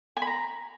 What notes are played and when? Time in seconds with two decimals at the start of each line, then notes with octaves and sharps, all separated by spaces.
0.17 G#5
0.22 B5
0.27 A#5